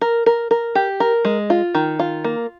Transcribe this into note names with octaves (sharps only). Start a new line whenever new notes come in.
A#4
A#4
A#4
G4
A#4
G#3
F4
D#3
F4
A#3